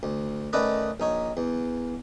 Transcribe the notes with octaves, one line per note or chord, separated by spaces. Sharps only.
D2
D#3 A3 C#4 B4 D5 D#5
A#1 D#4 C#5
E2